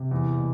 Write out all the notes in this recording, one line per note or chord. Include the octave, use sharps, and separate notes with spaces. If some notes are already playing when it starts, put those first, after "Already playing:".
Already playing: C3
E2
B2